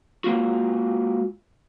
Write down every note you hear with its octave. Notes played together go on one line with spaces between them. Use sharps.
G#3 A#3 F4 F#4